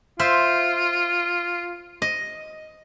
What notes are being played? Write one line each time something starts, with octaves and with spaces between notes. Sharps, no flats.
F4 C5 E5 F5
D#5